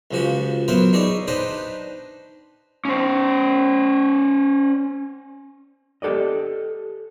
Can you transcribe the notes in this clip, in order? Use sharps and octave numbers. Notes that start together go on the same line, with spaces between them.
C#2 F3 F#4 G4
F#3 B3 A#4 C5 E5
D#4 E4 G#4 C#5 D5
D4 D#4 G4 B4 C5 D#5
C#4 C5
G4 A4 D5 D#5